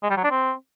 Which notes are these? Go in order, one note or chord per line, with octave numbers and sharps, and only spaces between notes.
G#3
G3
F#3
D4
C4